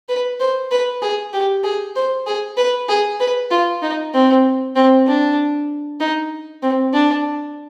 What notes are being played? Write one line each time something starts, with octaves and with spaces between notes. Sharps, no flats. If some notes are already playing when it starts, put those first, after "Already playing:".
B4
C5
B4
G#4
G4
G#4
C5
G#4
B4
G#4
B4
F4
D#4
C4
C4
D4
D#4
C4
D4